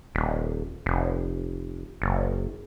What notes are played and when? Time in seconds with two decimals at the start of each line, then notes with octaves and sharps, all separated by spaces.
0.15 D#1
0.86 F1
2.02 F#1